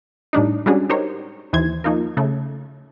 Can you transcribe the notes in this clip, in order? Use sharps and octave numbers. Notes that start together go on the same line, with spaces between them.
A2 G3 D4 D#4
G3 G#3 C#4 D4 F#4 G#4
D#4 G4 A#4 C5 C#5
D#2 E3 C5 G#6
F3 A#3 D#4 F4 A#4
C#3 A3